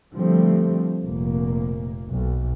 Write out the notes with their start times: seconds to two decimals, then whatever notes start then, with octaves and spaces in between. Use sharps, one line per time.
0.14 D3 F3 G3 A3 C4
1.03 F1 A#2 A#3
2.08 B1